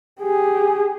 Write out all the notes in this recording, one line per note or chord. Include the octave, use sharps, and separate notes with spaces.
G4 G#4